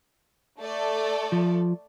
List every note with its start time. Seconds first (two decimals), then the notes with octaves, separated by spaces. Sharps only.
0.59 A3 A4 D5
1.32 F3